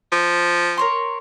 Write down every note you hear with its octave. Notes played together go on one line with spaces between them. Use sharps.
F3
A#4 C#5 C6